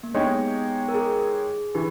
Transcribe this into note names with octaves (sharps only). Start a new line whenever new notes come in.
A#3
G#3 B3 D#4 G4 C#5
A#4
G#4
E3 G4